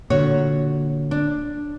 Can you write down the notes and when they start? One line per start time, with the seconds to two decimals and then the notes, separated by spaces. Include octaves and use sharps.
0.10 A#2 D3 F#4 C#5
1.11 D4